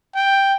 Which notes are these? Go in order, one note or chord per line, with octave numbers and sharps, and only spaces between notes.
G5